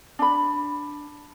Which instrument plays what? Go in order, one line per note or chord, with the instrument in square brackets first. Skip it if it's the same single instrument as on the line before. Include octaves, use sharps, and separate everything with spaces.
[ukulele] D4 B5